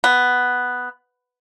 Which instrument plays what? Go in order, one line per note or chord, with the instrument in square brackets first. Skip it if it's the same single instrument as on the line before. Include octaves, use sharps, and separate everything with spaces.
[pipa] B3